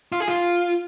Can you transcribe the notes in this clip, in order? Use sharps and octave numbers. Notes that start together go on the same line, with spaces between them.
F4
G#4
F4